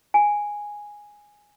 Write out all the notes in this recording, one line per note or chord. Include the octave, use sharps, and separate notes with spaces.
G#5